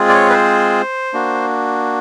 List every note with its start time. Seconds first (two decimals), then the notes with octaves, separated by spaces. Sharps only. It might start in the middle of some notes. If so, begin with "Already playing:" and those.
Already playing: G#3 C4 F4 G#4
0.09 D5
0.14 C#5
0.30 B4
0.34 C5
1.13 A#3 D4 F#4